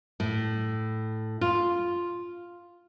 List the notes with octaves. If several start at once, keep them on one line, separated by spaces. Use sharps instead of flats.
A2
F4